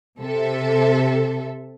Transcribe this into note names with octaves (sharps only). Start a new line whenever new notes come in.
C3 A4 E5